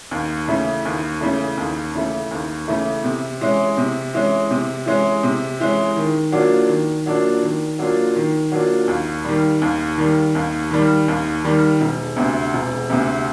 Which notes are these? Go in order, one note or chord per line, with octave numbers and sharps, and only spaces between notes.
D#2
C#3 E3 A3
D#2
C#3 E3 A3
D#2
C#3 E3 A3
D#2
C#3 E3 A3
C3
E3 G#3 C#4
C3
E3 G#3 C#4
C3
E3 G#3 C#4
C3
E3 G#3 C#4
D#3
F#3 A#3 D4 F4
D#3
F#3 A#3 D4 F4
D#3
F#3 A#3 D4 F4
D#3
F#3 A#3 D4 F4
D#2
D#3 G3
D#2
D#3 G3
D#2
D#3 G3
D#2
D#3 G3
E1
D2 C3
E1
D2 C3